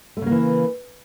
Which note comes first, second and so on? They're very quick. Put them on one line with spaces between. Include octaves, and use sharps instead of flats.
A3 C#3 A#3 E3